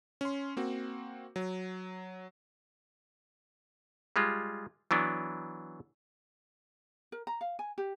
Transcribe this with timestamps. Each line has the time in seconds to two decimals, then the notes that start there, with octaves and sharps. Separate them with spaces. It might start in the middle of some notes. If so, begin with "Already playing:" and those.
0.21 C#4 C6
0.57 A#3 C4 F#4
1.36 F#3
4.16 G3 G#3 F4
4.91 E3 F#3 B3 D4
7.12 A#4
7.27 A#5
7.41 F5
7.59 G#5
7.78 G4